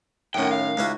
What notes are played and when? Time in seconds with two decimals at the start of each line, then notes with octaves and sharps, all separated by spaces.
0.34 F#2 A2 D#3 C#4 F#5 G5
0.51 F5
0.77 C#2 C#4 D#4 E4 F#4